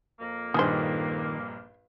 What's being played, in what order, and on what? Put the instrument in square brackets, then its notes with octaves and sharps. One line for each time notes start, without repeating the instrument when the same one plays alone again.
[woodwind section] F2 A#3
[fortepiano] A#1 G2 [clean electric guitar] D#3 [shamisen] D#4 G#4 C5